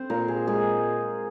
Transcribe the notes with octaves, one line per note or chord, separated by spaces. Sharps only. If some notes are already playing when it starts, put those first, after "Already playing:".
Already playing: C4 C5
A#2 A#4
G#4
G#3 G#4